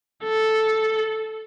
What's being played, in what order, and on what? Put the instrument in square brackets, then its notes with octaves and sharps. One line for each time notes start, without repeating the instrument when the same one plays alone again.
[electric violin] A4